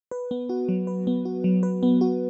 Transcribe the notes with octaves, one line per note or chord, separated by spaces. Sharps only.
B4
B3
F#4
F#3
B4
B3
F#4
F#3
B4
B3
F#4